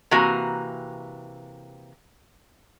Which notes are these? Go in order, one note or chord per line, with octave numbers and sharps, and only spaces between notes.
C3 E3 A#3 F#4 G#5 A#5